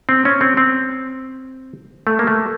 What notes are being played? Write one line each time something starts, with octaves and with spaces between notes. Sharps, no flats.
C4
C#4
C4
C4
A3
A#3
A3